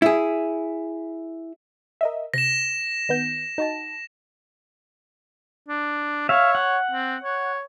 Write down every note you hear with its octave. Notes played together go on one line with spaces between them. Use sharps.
E4 G#4
A#4 D#5 E5
C3 A#6 E7
D#3 B3 G6
D#4 F#4 A5
D4
C#5 E5 F5
F#5
C4
C#5